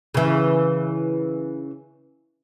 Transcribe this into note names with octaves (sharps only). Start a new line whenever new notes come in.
C#3 E3